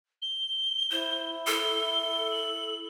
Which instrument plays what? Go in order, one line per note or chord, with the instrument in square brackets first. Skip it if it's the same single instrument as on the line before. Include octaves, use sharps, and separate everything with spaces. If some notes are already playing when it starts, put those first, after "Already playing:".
[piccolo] G7
[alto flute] E4 [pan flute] C5
[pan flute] A4 [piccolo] G7
[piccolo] F#7